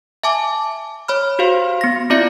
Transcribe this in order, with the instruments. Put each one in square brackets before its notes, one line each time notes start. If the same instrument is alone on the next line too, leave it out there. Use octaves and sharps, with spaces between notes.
[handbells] E5 G#5 A5 D6
C#5 B5 F6
F#4 G4 C5 F5
B3 A#6
C4 E4 F4 D5 E5 C#7